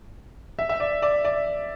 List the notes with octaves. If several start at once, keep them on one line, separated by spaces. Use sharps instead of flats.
E5
E5
D5
D5
D5